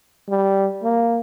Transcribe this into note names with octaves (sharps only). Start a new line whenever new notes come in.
G3
A#3